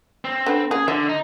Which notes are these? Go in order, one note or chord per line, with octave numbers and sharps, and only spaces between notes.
C4
D3 B4
C#3 A#3 G#4
D3 E5
D#4